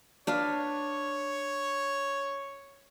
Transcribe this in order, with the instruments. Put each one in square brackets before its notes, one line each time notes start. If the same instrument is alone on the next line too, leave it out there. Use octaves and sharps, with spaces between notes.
[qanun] D4 B4 F5 [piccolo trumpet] C#5